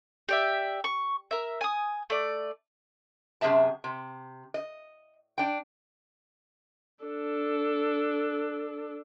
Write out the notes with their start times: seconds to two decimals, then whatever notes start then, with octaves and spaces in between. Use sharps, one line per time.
0.29 G4 D5 E5
0.84 C#6
1.31 A#4 E5
1.61 G#5 D#6
2.10 A3 D5
3.41 F#2 C3 D4 G#4 E5 A5
3.84 C3
4.54 D#5
5.38 D4 G5
7.04 D4 A4